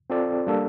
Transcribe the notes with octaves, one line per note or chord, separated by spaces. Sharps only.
C4 F4 A4 D5
G3 A#3 D4 A4